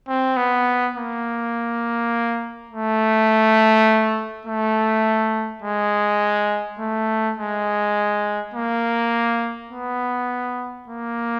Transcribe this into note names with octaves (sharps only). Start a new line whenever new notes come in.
C4
B3
A#3
A3
A3
G#3
A3
G#3
A#3
B3
A#3